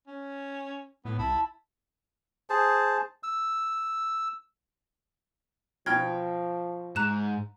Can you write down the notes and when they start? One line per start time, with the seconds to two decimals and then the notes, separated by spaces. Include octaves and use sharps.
0.07 C#4
1.05 A2 B3
1.18 C2 E4 A5
2.50 G#4 C5 A5
3.23 E6
5.86 B2 F3 G5 F6 G#6
6.96 G#2 A#5 F#6 E7